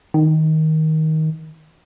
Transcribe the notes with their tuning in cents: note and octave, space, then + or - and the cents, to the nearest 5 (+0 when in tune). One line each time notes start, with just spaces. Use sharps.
D#3 +15